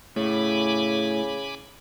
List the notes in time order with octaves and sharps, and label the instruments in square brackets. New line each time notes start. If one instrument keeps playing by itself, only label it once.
[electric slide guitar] A2 [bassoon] C#3 [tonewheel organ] G#5 B5 D6